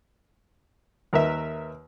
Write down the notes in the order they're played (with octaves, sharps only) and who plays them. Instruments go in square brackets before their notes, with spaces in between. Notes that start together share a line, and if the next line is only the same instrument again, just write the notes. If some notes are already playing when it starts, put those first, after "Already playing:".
[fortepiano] D#2 A#4 B4 E5